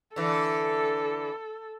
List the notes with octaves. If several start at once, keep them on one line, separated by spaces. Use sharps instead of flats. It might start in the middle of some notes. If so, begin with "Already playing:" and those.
D3 E3 A4